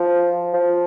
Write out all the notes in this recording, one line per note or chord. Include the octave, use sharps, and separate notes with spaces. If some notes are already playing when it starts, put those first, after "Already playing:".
Already playing: F3
F3